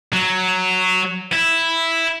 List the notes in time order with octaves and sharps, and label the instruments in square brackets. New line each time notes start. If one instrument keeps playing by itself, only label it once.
[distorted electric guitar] F#3
E4